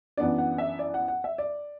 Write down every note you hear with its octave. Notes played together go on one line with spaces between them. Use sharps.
F#2 E3 B3 D4 D5
F#5
E5
D5
F#5
F#5
E5
D5